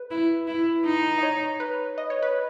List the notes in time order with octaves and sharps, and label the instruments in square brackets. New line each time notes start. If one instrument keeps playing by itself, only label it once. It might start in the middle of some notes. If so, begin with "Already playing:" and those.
Already playing: [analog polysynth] B4
[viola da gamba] E4
E4
D#4
[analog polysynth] D#5
C#5
B4
D#5
C#5
B4